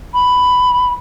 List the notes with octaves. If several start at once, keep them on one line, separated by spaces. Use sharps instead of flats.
B5